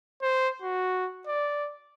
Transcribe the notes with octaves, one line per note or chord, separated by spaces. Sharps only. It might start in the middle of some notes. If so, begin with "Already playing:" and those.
C5
F#4
D5